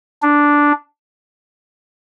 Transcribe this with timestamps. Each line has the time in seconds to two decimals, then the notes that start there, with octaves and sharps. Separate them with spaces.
0.22 D4